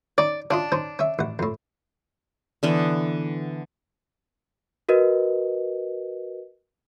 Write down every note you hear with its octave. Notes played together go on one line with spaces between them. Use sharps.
C#4 D#4 D5
C#4 D4 F4 D#5
C#4 D#4 C5
C#4 E5
A1 F#5
F2 A2
D3 E3 B3
F#4 A#4 B4 D#5